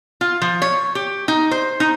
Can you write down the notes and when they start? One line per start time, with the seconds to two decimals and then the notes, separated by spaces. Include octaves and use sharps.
0.21 F4
0.42 F3
0.62 C#5
0.95 G4
1.28 D#4
1.51 C5
1.80 D#4